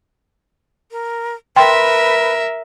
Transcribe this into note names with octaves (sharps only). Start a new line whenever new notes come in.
A#4
A#4 B4 E5 G5 C6